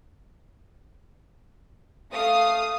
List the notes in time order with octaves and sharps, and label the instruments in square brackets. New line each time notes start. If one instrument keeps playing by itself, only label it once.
[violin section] A3 F5 D#6